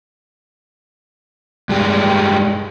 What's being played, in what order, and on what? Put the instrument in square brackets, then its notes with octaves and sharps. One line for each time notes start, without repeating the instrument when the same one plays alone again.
[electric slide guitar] G2 G#3 G4